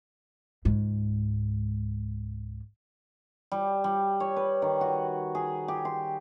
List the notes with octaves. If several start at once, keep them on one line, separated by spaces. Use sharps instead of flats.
C#2 G#2
G3
G3
C#5
B4
D#3
F#4
G#4
G4
C6